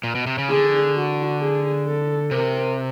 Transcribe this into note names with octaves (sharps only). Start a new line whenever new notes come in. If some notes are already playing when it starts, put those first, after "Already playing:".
A#2
B2
C3
C#3
D3 G#4
F#4
G#4
A4
C3 A#4